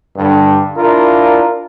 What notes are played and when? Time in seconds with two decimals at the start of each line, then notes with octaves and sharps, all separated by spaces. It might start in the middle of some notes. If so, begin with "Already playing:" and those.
0.16 G2 D3
0.76 D4 E4 F4 A#4